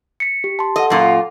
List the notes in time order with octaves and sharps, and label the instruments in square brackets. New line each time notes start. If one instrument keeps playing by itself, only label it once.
[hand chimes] B6 C#7
G4
A5 C6
[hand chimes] A4 F#5 [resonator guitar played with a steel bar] D#5
[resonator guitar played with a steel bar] F#2 A#2 F4